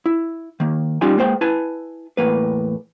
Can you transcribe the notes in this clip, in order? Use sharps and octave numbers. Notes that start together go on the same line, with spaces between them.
E4
D#3 A#3
G3 C#4 D#4 F4 G5 G#5
G#3 A#3 C5 G5
E4 B4 G#5 A5
E2 A2 D#3 A#3 B4